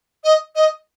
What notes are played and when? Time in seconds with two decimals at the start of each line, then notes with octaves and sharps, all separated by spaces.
0.24 D#5
0.55 D#5